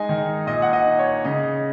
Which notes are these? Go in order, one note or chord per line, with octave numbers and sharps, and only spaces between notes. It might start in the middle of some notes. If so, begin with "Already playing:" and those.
Already playing: G#3 D#4 D#5 G#5
D#3
A#2 D#5
F#5
D#5
D#4
C#5
C#3 D#5